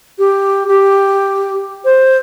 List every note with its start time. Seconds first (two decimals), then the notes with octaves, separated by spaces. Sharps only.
0.18 G4
0.67 G4
1.84 C5